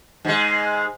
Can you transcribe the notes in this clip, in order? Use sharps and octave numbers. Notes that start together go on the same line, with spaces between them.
G#2 G#3